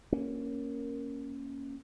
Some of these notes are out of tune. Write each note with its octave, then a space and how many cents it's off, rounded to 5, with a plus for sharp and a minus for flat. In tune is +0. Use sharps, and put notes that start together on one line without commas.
A#3 +0 C#4 +0